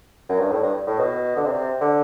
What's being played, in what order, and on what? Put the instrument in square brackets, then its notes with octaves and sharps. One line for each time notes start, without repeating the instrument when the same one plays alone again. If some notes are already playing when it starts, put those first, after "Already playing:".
[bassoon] F#2
G2
A2
G2
A2
B2
D3
C3
D3